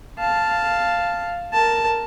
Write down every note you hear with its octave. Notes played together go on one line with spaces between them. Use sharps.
F5 A5
A#4 A5